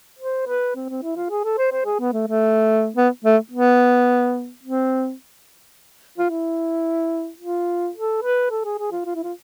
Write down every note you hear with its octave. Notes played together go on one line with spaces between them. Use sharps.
C5
B4
C4
C4
E4
F4
G#4
A4
C5
C5
G#4
B3
A3
A3
B3
A3
B3
C4
F4
E4
F4
A4
B4
A4
G#4
G#4
F4
F4
E4
F4